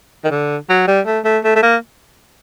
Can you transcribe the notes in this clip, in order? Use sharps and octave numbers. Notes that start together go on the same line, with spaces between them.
D#3
D3
F#3
G3
A3
A3
A3
A3
A#3